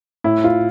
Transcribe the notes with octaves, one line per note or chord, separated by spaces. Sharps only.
A2 E4
F4